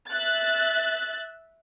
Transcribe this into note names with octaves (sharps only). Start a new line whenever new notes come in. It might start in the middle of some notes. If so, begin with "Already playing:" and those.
E5 F#6 A6